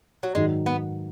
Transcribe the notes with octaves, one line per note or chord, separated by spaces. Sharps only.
F#3
G#2 D#3 F#3 G#3
B3